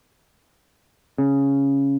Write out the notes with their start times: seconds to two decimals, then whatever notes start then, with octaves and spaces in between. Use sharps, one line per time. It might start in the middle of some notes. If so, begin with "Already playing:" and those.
1.18 C#3